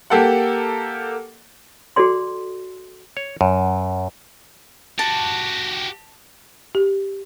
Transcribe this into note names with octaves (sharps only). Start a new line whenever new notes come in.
A#3 G4 A4 A#4 F#5
F#4 G#4 A4 D5 C6
C#5
F#2
F#4 G4 A5
G4